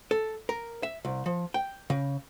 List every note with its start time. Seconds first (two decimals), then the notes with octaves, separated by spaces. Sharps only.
0.11 A4
0.49 A#4
0.83 E5
1.05 C2
1.26 F3
1.54 G5
1.90 C#3